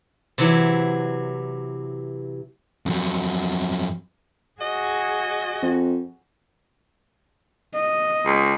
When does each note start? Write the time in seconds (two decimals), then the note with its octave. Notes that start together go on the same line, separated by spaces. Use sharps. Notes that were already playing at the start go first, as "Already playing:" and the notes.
0.38 C3 E3 F#3
2.86 F2 F#3
4.61 F#4 G#4 D#5
5.62 F2
7.74 D#5
8.26 C#2